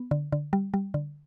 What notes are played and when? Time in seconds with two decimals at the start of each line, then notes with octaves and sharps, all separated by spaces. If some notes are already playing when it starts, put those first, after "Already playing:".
Already playing: B3
0.11 D3
0.32 D3
0.53 G3
0.74 G3
0.94 D3